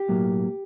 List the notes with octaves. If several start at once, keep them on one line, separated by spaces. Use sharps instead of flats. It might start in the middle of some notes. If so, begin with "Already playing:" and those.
Already playing: G4
B1 A2 F#3 A#3